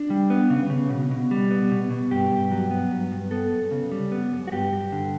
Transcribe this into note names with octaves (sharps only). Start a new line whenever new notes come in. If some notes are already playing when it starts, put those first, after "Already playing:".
Already playing: D4
G3
B3
C#3
C#3
B2
B2
G3
B3
B2
B2
G2 G4
G2
F#3
B3
G2
G2
B3 A4
F#2
C#3
G3
B3
F#2
F#4
G2 G4
G2
D3